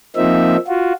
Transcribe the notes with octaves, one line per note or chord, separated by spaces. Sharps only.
F3 A#3 C4 D#4 E5
F4 F#4